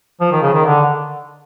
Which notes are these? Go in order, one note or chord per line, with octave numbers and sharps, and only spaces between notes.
F3
D#3
C#3
D#3
D3